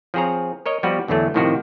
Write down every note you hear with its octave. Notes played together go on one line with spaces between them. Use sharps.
F3 C4 G#4 C#5 A#5
A#4 C#5 D#5
F3 G3 B3 F#4 G4 B4
E2 D3 E3 F#3 A3
A2 C3 D#3 F3 F#4 G4